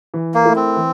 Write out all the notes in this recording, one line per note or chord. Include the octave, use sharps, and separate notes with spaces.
E3
A#3
A3 E4 A#4
C4
E3